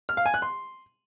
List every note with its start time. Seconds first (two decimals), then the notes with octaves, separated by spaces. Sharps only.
0.09 F6
0.17 F5
0.26 G#5
0.34 F#6
0.42 C6